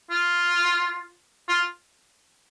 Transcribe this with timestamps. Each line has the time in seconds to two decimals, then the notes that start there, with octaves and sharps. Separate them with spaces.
0.11 F4
1.48 F4